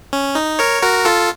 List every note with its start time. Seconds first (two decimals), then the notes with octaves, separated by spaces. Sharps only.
0.13 C#4
0.35 D#4
0.59 A#4 C#5
0.83 F#4 A#4
1.05 F4 A4